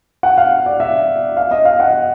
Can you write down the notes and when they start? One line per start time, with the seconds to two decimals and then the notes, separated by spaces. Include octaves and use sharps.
0.23 F#5
0.38 F5
0.66 D5
0.80 E5
1.37 F5
1.51 D#5
1.65 F5
1.80 F#5